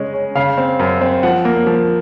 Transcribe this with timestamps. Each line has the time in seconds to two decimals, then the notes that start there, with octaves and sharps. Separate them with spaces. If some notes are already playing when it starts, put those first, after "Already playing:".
Already playing: C#3 G#3 C#4 D#5
0.13 C#4
0.35 C#3 F5
0.57 C4
0.79 F#2
1.01 C4
1.23 F3 F#5
1.45 A#3
1.67 F3